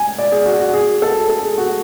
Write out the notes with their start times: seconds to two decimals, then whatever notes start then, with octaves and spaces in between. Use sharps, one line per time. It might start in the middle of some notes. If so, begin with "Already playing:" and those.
Already playing: G#5
0.18 D5
0.32 G#4
0.45 F#4
0.60 F#4
0.74 G#4
1.02 A4
1.29 A4
1.43 G#4
1.58 F#4